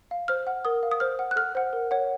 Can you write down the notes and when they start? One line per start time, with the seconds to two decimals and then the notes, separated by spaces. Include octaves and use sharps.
0.11 F5
0.28 C5 F6
0.47 F#5
0.65 A#4 D#6
0.83 F5
0.91 D#6
1.00 C5 F6
1.19 F#5
1.31 F#6
1.36 A4 F6
1.55 C5 F#5
1.73 A#4
1.91 C#5 F#5